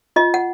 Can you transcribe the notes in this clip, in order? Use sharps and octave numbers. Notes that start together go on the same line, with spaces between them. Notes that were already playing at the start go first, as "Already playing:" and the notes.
F4 D#5
F#5